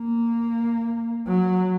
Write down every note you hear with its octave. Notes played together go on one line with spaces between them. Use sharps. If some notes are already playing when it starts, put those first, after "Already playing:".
Already playing: A#3
F#3